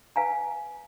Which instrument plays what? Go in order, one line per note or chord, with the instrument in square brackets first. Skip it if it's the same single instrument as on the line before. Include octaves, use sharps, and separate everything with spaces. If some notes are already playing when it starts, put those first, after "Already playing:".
[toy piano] B4 F5 G#5 A#5